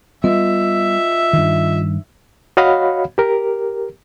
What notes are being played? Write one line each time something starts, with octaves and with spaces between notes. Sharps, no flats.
G3 B3 F4 D#5 E5
G2 D#3
F#4 C#5 D#5 F5 F#5 B5
G4 A#4